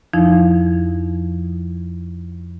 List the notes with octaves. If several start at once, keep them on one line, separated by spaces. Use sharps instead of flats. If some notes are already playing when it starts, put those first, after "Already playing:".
F2 F3 D#4 E4